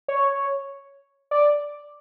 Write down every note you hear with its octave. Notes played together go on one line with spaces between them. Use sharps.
C#5
D5